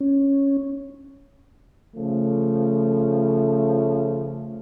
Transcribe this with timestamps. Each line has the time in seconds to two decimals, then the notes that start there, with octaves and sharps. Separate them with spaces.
0.01 C#4
1.96 C#3 F3 A3